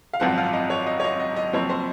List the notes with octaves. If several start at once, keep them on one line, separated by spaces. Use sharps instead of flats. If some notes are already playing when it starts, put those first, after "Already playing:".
F5
G#1 F#2 F3 C4 F#5
F5
D#5
C#5
D#5
C#5
D#5
D#5
D#5
F#1 F#2 F3 C4 C#5
C5